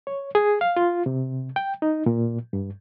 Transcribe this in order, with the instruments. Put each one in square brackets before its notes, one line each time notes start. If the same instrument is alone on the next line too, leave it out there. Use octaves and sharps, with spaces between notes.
[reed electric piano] C#5
G#4
F5
F4
C3
G5
D#4
A#2
G2